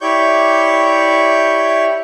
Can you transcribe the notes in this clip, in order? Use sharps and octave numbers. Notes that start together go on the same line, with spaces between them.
E4 G4 C#5 D5 C#6 G6